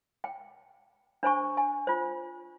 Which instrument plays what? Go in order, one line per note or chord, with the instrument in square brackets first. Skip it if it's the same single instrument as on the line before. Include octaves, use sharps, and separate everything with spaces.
[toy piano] G5
D4 C5 G#5 C#6
G#5
F4 C5